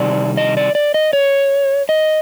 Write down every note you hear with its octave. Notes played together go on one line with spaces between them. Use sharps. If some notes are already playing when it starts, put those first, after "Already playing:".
Already playing: C3 D#3 G3 D5
D#5
D5
D5
D#5
C#5
D#5